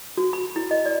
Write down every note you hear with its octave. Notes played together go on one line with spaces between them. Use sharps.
F#4
B5
E4
D#5
D5